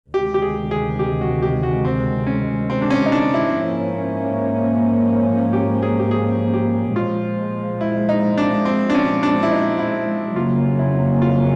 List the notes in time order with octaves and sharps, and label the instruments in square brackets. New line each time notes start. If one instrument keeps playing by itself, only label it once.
[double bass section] D2 C3 D#3 G#3 [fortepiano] G4
[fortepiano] G4
G#4
G#4
G4
F#4
G4
F#4
C4
C#4
C4
D4
C#4
D#4
D4
E4
[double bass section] G#2 F3 A#3 C#4
[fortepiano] G4
G#4
G4
G#4
G4
[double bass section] A#2 F3 G#3 [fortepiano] F4
[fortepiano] E4
D#4
D4
C4
D4
C#4
D4
E4
D#4
E4
[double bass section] F2 C#3 F#3 A#3 C#4 [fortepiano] F4
[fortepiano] E4
F4